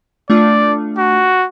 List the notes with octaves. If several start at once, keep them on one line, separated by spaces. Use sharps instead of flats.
A3 D4 F4 D5
F#4